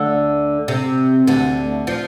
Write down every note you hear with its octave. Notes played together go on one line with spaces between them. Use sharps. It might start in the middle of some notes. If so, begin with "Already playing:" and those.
Already playing: D2 D3
C3
D2 D3
F3